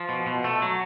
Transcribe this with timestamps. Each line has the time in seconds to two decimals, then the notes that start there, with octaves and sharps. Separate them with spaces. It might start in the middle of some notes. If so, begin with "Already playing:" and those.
Already playing: F3
0.09 B2
0.27 B2
0.44 A3
0.62 F#3